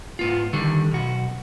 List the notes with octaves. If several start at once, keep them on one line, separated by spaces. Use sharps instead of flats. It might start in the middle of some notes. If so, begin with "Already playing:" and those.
G#2 B3 F4
D3 D#3 G3
B1 F#4